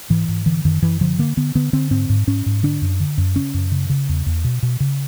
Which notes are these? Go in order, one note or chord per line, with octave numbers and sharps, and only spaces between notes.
G#2 E3
G#2
D3 E3
F#2 D#3
F#2 E3
D3 F3
D3 A#3
D3 B3
D3 B3
D3 C4
G#2 C4
G#2
G#2 C#4
G#2
D3 D4
F#2
D3
F#2
C#3 C#4
F#2
C#3
C#3
E2
E2
B2
B2
C#3